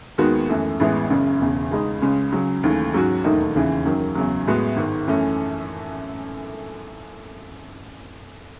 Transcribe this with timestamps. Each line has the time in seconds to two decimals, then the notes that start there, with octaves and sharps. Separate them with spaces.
0.18 D#2 D#3 G#3 B3 F#4
0.49 F#2 E3 A3
0.80 A1 A2 E3 G#3 B3
1.10 F#1 F#2 C#3
1.41 E1 E2 C#3
1.71 C#2 C#3 G#3 D#4
2.02 C#2 C#3 G#3 C#4
2.33 C#2 C#3 F#3
2.63 D#2 C#3 E3 A3
2.94 G#2 F#3 C#4 F#4
3.24 E1 D#2 D#3 A3 D#4
3.55 E1 D#2 C#3 E3
3.86 F#2 D#3 F#3
4.15 E2 C#3 F#3
4.47 A2 G#3 B3 F#4
4.77 G#1 G#2 D#3
5.08 F#2 E3 A3 C#4